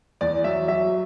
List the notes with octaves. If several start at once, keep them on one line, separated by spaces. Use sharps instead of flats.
E2 D5
F#3 E5
F#3 E5